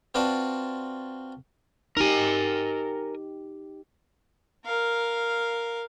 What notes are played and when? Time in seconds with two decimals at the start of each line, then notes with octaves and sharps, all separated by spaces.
0.15 C4 F4 F#4 B4 D5 A5
1.97 D#4 G4 A#4 G#5
4.65 A#4 F5